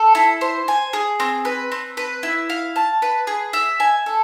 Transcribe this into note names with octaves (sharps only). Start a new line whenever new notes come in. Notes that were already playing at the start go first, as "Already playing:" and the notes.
Already playing: A4
E4
C5
G#5
G#4
C4
B4
C4
B4
E4
F5
A5
B4
G#4
E5
G#5
A4